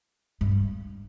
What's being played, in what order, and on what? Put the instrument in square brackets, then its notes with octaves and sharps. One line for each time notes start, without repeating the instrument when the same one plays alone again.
[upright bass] G2